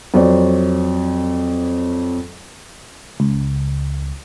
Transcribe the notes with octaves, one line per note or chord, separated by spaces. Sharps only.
F2 F#3 C5 D5
C#2